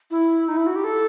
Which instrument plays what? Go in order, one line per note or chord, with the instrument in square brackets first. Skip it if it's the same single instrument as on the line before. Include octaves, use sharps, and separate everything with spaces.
[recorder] E4
D#4
E4
F#4
G4
A4